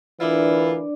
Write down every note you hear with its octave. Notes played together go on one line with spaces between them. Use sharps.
D2 E3 D4 E4 F4 A#4 B4 D5